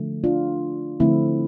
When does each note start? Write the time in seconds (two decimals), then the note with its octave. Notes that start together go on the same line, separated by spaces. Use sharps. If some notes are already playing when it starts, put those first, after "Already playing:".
Already playing: D3 F3 A3
0.24 D4 F4
1.00 D3 F3 A3 C4 E4